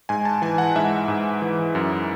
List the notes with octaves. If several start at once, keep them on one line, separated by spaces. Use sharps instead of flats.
G#2 G#5
A5
E3 G#5
F#5
G#2 E5
G#2
E3
F#2